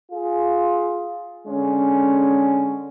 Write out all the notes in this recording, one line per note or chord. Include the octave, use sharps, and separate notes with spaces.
F4 G#4
D3 G#3 C#4